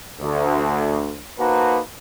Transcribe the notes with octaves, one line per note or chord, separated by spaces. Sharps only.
D2
A#3 D#4 F#4 B4 C5 A5